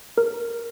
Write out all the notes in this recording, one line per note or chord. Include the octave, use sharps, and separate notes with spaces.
A#4